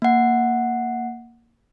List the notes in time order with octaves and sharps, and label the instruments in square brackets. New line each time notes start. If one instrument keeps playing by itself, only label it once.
[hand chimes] A#3 F#5